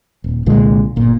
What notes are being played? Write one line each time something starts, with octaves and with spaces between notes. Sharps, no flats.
D#1
C2 A#2 D3 G#3
G1 A#2